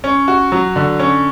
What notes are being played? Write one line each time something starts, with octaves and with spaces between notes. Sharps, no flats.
C#4
F#4
F#3
D3
C#4